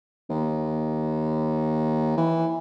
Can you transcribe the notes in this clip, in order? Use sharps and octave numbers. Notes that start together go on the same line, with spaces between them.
D#2
E3